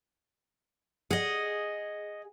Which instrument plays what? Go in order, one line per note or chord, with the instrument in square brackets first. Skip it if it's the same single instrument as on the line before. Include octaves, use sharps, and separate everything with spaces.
[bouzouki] G#4 [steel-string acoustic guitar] D#5 F#5